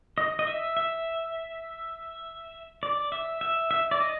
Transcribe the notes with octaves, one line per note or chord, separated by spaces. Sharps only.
D#5
D#5
E5
E5
D5
E5
E5
E5
D5
D#5